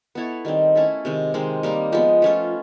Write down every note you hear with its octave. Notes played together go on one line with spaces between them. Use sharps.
B3 E4 A4 C#5
D#3 G3 C4 D#4
A3 C#4 E4 A4
C3 D#3 G#3
D#3 G#3 C4
G3 A#3 D#4
F3 G#3 B3
A3 C#4 F4